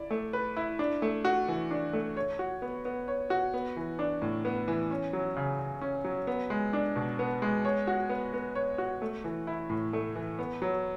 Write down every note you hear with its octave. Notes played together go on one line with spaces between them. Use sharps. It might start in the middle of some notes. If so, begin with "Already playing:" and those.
Already playing: E4 D5
A3
B4
E4
D4
A3
F#4
E3
D4
A3
C#5
F#4
B3
B3
C#5
F#4
B3
E3
D4
A2
B3
E3
C#4
F#3
C#3
C#3
C#4
F#3
B3
G#3
D4
B2
B3
G#3
C#5
F#4
B3
B3
C#5
F#4
A3
E3
E4
A2
A3
E3
B3
F#3